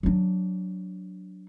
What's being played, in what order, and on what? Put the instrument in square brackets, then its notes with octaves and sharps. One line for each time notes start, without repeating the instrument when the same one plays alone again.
[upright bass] F#3 D4